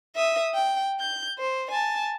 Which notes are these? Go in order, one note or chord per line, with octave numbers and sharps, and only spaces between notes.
E5 D#6
G5
G6
C5
G#5 A5